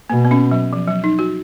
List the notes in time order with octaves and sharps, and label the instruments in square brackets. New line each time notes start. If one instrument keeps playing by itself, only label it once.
[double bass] B2 [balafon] A#3
[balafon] B3
C#4
F#3
F3
F#3
D#4
F#4